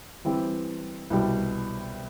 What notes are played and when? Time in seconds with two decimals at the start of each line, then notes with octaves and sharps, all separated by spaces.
0.25 E3 G3 C4 E4 G4
1.10 C2 B2 G3